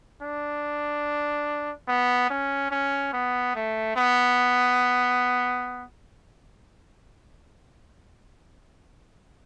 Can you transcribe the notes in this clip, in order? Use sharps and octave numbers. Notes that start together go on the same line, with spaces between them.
D4
B3
C#4
C#4
B3
A3
B3